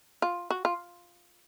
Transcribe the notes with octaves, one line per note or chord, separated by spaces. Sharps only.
F4
F#4
F4